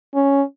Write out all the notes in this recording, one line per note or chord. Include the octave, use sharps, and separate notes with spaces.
C#4